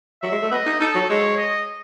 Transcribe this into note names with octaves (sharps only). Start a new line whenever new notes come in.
F#3 E5
G#3
A3
B3 D#5
D#4
D#4 A4
F#3
G#3 C#5
D#5